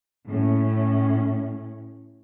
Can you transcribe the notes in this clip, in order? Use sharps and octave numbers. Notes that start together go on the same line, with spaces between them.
A2 C#4